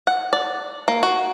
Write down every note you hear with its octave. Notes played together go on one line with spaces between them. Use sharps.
F#5
D5
A#3
F#4